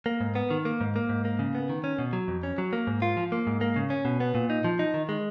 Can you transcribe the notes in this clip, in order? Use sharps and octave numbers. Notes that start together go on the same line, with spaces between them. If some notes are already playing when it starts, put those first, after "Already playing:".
A#3
G#2
B3
D#3
A#3
G#2
A#3
G#2
A#3
C#3
B3
D#3
C#4
B2
F#3
F2
C#4
F#3
A#3
G#2
F4
F3
A#3
G#2
A#3
C#3
C#4
B2
B3
A#2
D#4
F3
D#4
D#3
G#3